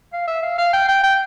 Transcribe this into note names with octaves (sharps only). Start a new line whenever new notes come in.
F5
E5
F5
F5
G5
G5
G5